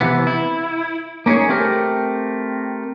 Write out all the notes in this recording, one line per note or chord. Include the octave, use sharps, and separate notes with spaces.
C3 E3 B3
E4
A#3 C#4 D#4 G#4 C#5
A3 C4 G4 A#4